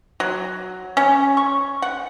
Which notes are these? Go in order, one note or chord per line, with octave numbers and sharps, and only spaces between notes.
F#3
C#4
C#6
F#5